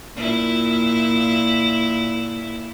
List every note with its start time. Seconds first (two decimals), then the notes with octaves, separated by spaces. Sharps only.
0.16 A#2 E4